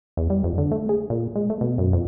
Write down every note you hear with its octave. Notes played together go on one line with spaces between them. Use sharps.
E2
G3
F2
D3
A3
G#4
A#2
G#3
A3
B2
F#2
F2